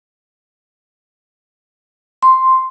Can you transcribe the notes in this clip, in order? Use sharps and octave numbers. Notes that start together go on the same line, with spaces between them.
C6